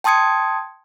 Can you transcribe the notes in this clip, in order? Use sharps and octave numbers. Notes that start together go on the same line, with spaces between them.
G5 A5 C6 D#6 G#6 C#7